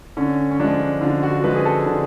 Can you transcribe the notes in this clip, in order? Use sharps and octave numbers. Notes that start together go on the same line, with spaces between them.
D3 C#4
C#4
F3 G#3 D4
D3 F4
F#4
F3 G#3 B4
G#4
A4
D3